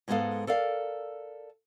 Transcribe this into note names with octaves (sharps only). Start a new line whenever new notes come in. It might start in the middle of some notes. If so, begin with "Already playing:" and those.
G#2 G#3 B3 F#4 A4 F5
A4 A#4 D5 F5